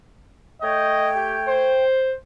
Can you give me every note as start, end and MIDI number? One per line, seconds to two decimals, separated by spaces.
0.62 1.85 57
0.62 1.85 73
0.62 1.10 75
0.62 1.85 79
1.16 1.38 67
1.49 2.15 72